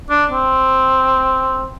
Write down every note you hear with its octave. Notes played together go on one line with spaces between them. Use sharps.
D4
C4